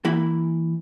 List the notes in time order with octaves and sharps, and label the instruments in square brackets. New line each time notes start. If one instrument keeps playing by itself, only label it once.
[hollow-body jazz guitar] E3 A#3 E4 B5